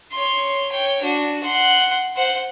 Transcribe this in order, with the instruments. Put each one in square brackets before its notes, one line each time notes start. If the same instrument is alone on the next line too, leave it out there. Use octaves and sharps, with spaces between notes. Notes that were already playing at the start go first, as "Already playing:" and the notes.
[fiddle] C#5 C6
C#5 G5
D4 F#4
F#5 C6
C5 F#5